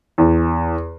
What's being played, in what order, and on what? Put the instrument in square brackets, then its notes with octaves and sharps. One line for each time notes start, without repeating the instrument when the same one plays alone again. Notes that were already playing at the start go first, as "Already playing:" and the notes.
[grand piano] E2